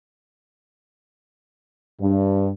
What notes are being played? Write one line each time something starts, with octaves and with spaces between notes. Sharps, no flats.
G2